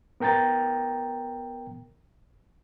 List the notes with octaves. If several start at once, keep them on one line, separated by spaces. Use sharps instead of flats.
B3 A#4 G5 A#5 A6